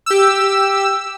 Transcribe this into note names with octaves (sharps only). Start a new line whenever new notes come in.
G4 E6